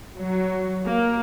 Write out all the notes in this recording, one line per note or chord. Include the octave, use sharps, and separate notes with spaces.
F#3
A#3